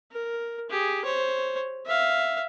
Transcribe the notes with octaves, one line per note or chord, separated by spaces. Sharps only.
A#4
G4 G#4
C5 C#5
E5 F5